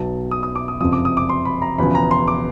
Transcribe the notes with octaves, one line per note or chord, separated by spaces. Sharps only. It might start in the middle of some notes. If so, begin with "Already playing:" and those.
Already playing: B1 B2 F#3 A5
D#6
D#6
D6
D#6
F#1 F2 C3 F3 D#6
D6
D#6
D6
C6
B5
A#5
E1 E2 C#3 F3 B5
A#5
C6
D6